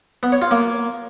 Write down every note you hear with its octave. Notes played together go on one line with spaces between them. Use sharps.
B3
C#5
F4
A#3